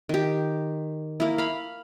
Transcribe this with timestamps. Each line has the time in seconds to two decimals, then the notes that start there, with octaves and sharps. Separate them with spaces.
0.09 D#3 G4
1.20 A#3 E4
1.38 F5 B5